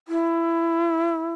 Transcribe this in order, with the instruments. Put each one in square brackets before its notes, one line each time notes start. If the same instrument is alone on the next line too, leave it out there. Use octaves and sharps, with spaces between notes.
[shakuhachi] E4